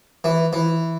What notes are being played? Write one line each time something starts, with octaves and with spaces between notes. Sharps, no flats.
E3
E3